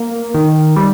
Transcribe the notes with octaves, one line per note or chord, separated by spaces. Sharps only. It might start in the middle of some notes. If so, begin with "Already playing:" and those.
Already playing: A#3
D#3
G3